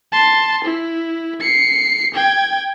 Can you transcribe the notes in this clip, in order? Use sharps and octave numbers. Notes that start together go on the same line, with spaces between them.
A5 C6
E4
C7 C#7
G5 G#6